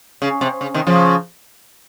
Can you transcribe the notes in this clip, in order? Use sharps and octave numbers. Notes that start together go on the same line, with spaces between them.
C#3
C3
C#3
C3 D#3
C#3 F3